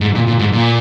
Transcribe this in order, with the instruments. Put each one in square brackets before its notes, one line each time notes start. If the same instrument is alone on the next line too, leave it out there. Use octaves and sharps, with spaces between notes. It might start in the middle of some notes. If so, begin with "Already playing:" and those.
[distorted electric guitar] G#2
A#2
A#2
G#2
A#2